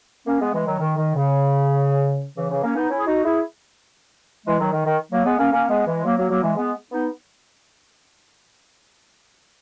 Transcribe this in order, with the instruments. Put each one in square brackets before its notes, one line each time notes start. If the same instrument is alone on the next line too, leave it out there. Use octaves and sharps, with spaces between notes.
[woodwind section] A#3 C#4
G#3 B3
E3 G#3
D#3 F#3
D#3
D#3
C#3
C#3 E3
C#3 E3
A#3 C#4
B3 D#4
C#4 E4
G#4
D#4 F#4
E4 G#4
E3 G#3
D#3 F#3
D#3
D#3
F#3 A#3
G#3 B3
A#3 C#4
A#3 C#4
G#3 B3
E3 G#3
F#3 A#3
F#3 A#3
F#3 A#3
E3 G#3
G#3 B3
B3 D#4